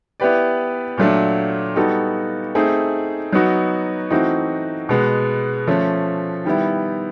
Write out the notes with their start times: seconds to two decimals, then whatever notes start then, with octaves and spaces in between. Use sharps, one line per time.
0.20 B3 E4 G4 B4 D5
0.97 A#2 F#3 A3 D4
1.76 G3 B3 D#4 F#4 A4
2.55 A3 C4 D#4 G#4
3.33 F#3 B3 D#4 F#4
4.10 E3 A3 C4 D#4 F#4
4.89 B2 G#3 B3
5.67 F3 A3 C#4
6.45 D#3 G3 B3 E4